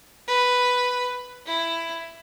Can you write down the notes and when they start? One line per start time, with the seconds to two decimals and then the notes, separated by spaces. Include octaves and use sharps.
0.28 B4
1.46 E4